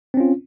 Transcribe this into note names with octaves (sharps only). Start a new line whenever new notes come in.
C4 C#4 F4